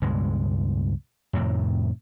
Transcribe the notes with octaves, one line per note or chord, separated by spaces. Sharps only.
C#2 G2 B2 G#3
F2 A2 C3 D#3